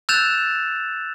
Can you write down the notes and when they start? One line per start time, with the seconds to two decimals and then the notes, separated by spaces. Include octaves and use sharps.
0.09 E6 F#6 G6 A6 E7 F7